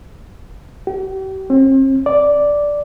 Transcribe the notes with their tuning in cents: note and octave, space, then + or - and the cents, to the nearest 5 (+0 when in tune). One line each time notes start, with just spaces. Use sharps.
G4 -40
C4 +40
D5 -5